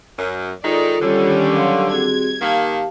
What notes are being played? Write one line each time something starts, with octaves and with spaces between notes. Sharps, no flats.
F#2
D#3 G#3 D#4 F4 A4 D5
D3 D#3 G3 C#4
F#3 F5 C6
C4 F#4 G#4 G#6
D#3 A#3 G4 F5 A5